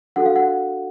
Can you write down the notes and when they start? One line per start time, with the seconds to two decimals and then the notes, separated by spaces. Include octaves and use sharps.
0.16 D4 F#4 A4 F#5
0.26 F5
0.36 F#5